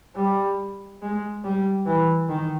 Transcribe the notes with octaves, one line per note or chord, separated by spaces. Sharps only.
G3
G#3
G3
E3
D#3